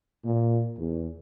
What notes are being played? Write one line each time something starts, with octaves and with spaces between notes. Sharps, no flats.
A#2
E2